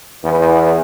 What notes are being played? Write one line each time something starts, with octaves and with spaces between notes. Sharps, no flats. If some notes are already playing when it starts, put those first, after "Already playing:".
E2 B4